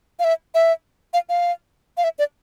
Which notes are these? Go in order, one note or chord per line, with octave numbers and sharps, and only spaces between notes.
F5
E5
E5
F5
F5
F5
E5
D5